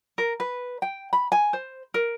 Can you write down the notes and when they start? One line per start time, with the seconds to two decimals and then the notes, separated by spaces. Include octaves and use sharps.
0.18 A#4
0.40 B4
0.82 G5
1.13 B5
1.32 G#5
1.53 C5
1.94 A#4